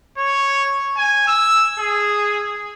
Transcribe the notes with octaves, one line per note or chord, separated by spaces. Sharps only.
C#5
G#5
E6
G#4